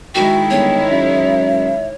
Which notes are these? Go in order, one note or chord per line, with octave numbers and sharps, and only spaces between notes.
D#3 G#3 E4 F#4 G5
G1 C#5
F#2 E5